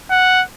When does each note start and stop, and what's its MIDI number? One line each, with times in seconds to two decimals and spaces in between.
0.11 0.43 78